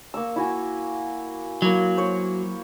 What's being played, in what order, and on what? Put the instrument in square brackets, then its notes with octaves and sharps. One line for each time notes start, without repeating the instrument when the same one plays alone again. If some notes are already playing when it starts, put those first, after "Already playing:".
[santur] A#3 C#6 E6
E4 F#4 G#5
[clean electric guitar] F#3 [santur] A#3 E4
[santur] C5 C#5